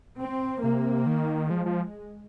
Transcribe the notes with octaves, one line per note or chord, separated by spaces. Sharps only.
C4
C3 A#3
D#3
F3 G#3
F3